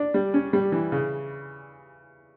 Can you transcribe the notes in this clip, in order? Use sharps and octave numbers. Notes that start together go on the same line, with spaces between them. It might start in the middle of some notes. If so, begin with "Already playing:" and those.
Already playing: D4
G3
C#4
G3
E3
C#3